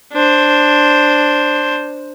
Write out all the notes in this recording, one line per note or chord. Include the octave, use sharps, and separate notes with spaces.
D4 C5